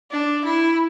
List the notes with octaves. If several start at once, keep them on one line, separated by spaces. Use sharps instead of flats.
D4
E4